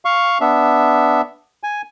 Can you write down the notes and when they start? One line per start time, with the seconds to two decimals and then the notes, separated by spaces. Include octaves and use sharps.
0.05 F5 C#6
0.41 B3 D4 E5
1.63 G#5